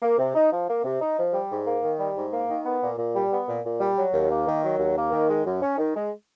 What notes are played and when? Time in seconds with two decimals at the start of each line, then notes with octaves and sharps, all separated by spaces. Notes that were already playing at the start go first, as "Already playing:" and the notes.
0.02 A#3
0.19 C3
0.35 D#4
0.52 F3
0.69 A#3
0.84 C3
1.01 D#4
1.18 F3
1.34 G3
1.51 G#2
1.67 A#3
1.83 D#3
2.00 G3
2.16 G#2
2.33 A#3
2.49 D#3
2.66 B3
2.82 A#2
2.99 A#2
3.16 G3
3.32 B3
3.48 A#2
3.64 A#2
3.81 G3
3.97 F#3
4.14 D#2
4.31 A#3
4.47 D#3
4.64 F#3
4.79 D#2
4.96 A#3
5.12 D#3
5.30 G#3
5.45 F#2
5.62 C#4
5.78 D#3
5.95 G#3